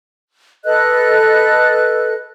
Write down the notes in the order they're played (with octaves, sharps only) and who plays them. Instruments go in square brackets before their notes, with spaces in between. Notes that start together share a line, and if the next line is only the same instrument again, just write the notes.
[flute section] A4 B4 D#5 F#6